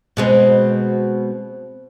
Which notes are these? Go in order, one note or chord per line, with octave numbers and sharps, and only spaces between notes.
B2 G#3 C4